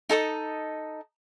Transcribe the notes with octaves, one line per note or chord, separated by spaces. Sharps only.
D#4 A4 D#5 D#6